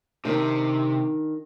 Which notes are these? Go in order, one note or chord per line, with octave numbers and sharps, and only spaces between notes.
C3 D#3 D4 D#4